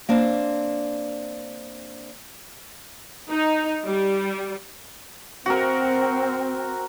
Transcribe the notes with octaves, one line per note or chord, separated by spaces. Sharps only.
A#3 C4 D4
D#4
G3
C4 F#4 A#4